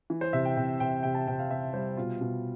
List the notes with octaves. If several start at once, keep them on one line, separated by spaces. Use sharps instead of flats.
E3
C5
C3 E5
G5
C3 G5
C3 G5
C3 G5
A5
C3 G5
F5
C3 E5
G3 C5
B2 F4
B2